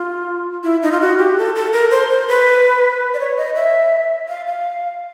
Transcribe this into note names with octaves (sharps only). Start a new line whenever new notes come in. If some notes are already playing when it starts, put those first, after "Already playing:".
Already playing: F4
E4
D#4
F4
F#4
G4
A4
A4
A#4
C5
C5
B4
D5
C#5
D#5
E5
F5
F5